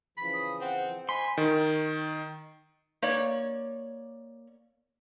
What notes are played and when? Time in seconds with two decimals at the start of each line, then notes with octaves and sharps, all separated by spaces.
0.17 C#3 E3 F3 B5
0.33 D#6
0.61 C4 F#5
1.09 C5 D#5 G#5 B5 C6
1.38 D#3
3.02 A#3 C#5 D5